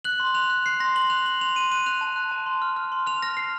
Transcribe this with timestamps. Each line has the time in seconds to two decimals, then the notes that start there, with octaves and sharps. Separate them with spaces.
0.04 F#6 F#7
0.20 C6
0.34 F#6 F7
0.50 F#6
0.66 F#6 C7
0.80 C6 A#6
0.95 C6 F#7
1.10 F#6 F7
1.26 C6 F#7
1.41 C6 F7
1.56 C6 D#7
1.71 F#6 D#7
1.86 F#6 F7
2.01 A5
2.16 F#6
2.31 A5
2.46 C6
2.62 F6
2.76 F6
2.92 C6
3.07 F6 F7
3.22 F6 A#6
3.37 F6 C7